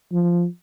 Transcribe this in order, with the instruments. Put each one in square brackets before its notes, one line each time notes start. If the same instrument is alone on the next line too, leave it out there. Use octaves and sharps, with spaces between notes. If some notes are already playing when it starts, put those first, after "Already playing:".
[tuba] F3